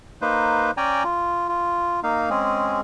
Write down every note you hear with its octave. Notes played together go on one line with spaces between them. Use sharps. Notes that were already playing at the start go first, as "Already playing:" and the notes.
A#3 D#4 B4 C5
C#4 D5 G5 G#5 A#5
F4
F4
A#3 D#4 F5
G#3 C4 C#4 G#4